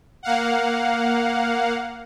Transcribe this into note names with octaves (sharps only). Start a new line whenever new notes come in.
A#3 F5 F#5